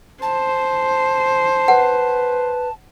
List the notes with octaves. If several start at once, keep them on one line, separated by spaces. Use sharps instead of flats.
C5 A5
B4 F#5